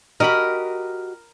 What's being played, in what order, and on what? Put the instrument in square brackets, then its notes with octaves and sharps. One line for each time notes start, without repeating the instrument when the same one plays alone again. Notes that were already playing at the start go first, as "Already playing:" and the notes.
[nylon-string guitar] F#4 G4 D#5 [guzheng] A#4 B5